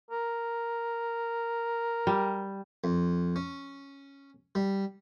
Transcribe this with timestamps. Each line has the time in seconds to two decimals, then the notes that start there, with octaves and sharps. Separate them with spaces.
0.10 A#4
2.07 G3
2.84 F2
3.36 C#4
4.55 G3